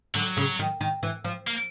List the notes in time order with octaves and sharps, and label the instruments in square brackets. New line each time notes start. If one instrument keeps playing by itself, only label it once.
[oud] D3 [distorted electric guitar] F#3
[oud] C#3
D#3
D#3
E3
F3
[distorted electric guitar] A#3